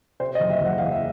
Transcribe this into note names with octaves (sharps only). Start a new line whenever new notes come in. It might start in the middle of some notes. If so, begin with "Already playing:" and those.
C3 C5
D#5
F#1
E5
F#1 F#5
E2 F5
E5